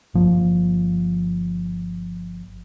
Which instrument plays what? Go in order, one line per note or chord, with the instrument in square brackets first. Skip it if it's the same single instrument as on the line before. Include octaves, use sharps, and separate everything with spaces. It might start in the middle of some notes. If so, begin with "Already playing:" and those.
[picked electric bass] G1 F3 A#3